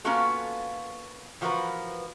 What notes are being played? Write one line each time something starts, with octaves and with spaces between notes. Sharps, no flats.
A#3 B3 C#4 F4 F#4 A4
E3 F3 F#4 G4 A#4 B4